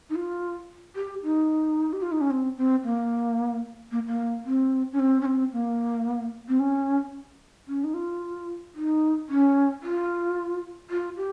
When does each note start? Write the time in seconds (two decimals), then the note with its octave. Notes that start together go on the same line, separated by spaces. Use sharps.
0.10 D#4
0.16 F4
0.96 G4
1.23 D#4
1.93 G4
2.02 F4
2.12 D#4
2.21 C#4
2.31 C4
2.57 C4
2.84 A#3
3.92 A#3
4.07 A#3
4.45 C4
4.93 C#4
5.00 C4
5.21 C#4
5.26 C4
5.53 A#3
6.49 C4
6.60 C#4
7.68 C#4
7.84 D#4
7.94 F4
8.75 D#4
9.29 C#4
9.83 F4
10.90 F4
11.17 G4